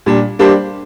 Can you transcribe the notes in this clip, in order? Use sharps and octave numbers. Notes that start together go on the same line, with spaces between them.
A#2 G3 D4
G3 A#3 D4 G4 C5